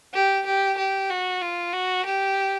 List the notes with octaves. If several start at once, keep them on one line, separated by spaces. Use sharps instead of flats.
G4
G4
G4
F#4
F4
F#4
G4